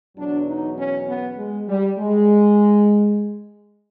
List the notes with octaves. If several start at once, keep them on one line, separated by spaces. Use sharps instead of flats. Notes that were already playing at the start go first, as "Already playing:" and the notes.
E2 B2 F#3 D4
D#4
C#4
B3
G#3
G3
G#3